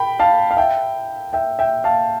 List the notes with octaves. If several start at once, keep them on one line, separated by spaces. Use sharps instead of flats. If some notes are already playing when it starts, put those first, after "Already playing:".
Already playing: G5 B5
F5 A5
F5
E5 G5
E5 G5
E5 G5
F5 A5